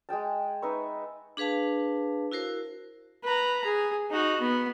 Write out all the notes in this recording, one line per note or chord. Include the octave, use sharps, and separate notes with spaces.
G#3 G#4 G5 A5
D#4 B4 E5 C#6
D4 G#4 B4 F5 A5
E4 F#4 A#4 C5
B4 A#5
G#4
D#4 F#4
B3